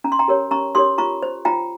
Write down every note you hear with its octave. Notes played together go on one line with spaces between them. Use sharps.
C#4 A#5
C6
G5 A#5
G4 A#4 C#5
C#4 A#5 C#6
G4 A#4 C#5 C6 D#6
F4 A#5 C#6
C5
F4 G5 A#5